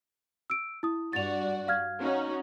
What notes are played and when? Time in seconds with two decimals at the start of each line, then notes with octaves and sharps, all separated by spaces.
0.50 E6 D7
0.83 E4 D#6
1.13 G2 F#4 D5 A6 F7
1.68 F5 F6 G#6
2.00 C#4 D#4 F#4